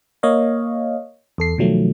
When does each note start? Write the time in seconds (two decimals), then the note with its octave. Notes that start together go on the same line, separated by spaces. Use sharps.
0.23 A#3 C#5 D#5 F5
1.38 E2 A4 C7
1.58 B2 D#3 F3 F#3 A3